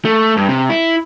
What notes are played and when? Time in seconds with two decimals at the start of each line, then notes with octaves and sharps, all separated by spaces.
0.05 A3
0.37 G2
0.49 C3
0.70 E4